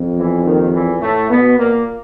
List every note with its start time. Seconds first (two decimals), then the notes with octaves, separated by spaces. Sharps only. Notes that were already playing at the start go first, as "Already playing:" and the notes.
Already playing: F2
0.16 E2 E3
0.44 D#2 D#3
0.72 E2 E3
1.01 A2 A3
1.29 B2 B3
1.58 A#2 A#3